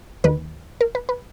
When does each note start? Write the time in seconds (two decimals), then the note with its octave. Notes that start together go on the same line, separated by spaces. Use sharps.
0.24 D#2 D#3 B4
0.81 A#4
0.95 B4
1.09 B4